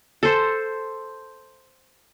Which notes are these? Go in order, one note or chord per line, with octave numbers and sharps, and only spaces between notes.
A4 C5